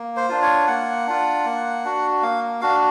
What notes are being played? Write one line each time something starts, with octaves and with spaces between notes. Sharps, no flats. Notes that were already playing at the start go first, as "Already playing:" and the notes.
Already playing: A#3
C5
D4 F4
C#5
A#3 F#5
D4 F4
A#3
D4 F#4
A#3 F5
D4 F#4 F5